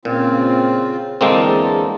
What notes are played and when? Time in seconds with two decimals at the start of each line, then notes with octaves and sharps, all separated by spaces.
0.05 A#2 C#3 C4 F4
1.21 E2 D3 G#3 A#3 C4 A4